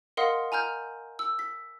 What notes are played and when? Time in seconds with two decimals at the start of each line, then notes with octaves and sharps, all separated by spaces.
0.17 A#4 D#5 F5 F#5 C6 D#6
0.52 G#5 A#5 F6 G6
1.19 E6
1.39 B6